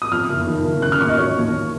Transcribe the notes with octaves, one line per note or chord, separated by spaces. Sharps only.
D#6
F2 F6
F#1
D#3
F#1
C#3 F#6
F6
D#2 C#6
D#5
F#3 C#5
D#2